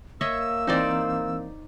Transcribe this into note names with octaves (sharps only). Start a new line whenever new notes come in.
A#3 C#5 D#5 E5 E6
E3 C4 D#4 C5 D5